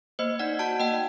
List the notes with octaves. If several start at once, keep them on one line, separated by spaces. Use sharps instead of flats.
A#3 C5 D#5
D#4 D5 F#5
F#4 F#5 A5
A#3 D#5 G5